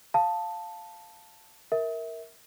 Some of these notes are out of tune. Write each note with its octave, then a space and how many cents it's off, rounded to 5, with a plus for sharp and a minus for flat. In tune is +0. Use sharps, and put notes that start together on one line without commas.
F5 +0 A5 +5 D#6 +0
A#4 +0 E5 -25